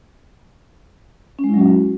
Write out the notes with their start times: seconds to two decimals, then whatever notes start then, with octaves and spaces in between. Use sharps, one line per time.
1.39 C#4
1.44 G#3
1.49 E4
1.54 F#3
1.59 F#4